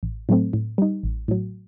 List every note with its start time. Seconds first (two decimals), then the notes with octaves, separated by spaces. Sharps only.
0.03 A1
0.29 A2 F#3 A3 C4
0.53 A2
0.78 G3 D#4
1.03 A1
1.28 A2 F#3